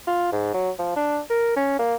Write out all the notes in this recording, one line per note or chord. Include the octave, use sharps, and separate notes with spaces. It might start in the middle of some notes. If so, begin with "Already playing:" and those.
F4
G#2
F#3
F3
D4
A#4
C#4
A#3